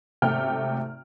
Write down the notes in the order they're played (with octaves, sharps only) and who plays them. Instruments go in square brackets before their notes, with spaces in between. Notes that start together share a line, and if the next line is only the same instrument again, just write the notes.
[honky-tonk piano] G#1 C3 A3 G5 F6